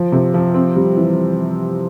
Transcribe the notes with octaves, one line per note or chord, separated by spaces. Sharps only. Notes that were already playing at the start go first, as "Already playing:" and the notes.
Already playing: F3
C3
F3
C4
G3
E3